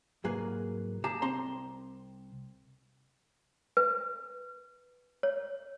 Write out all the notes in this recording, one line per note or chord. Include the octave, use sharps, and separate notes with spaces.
C2 G#2 F#3 A#3 G#4 B4
A#3 G4 G#4 A5 A#5
C2 C4 A5 A#5 C6
B4
C#5